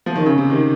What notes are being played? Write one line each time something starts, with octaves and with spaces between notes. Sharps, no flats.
F3
D#3
C#3
C3
D#3